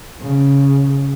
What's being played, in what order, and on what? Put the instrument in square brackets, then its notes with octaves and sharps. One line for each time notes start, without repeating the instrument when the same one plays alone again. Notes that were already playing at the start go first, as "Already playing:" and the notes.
[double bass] C#3